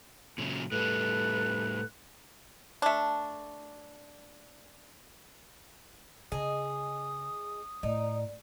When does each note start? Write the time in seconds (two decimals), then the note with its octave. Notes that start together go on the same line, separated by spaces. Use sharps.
0.38 A#2 C#3 F#3
0.72 A2 G3 A4 B4 F#6
2.82 A3 D4
6.32 C#3 G#4 D#5 D#6
7.83 A2 D#4 D5